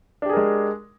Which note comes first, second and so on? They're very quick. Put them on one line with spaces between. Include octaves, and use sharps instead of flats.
D4 G4 G#4 A#4 G#3